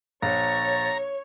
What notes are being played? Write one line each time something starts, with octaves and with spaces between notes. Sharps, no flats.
A#1 C#5 A#5 A6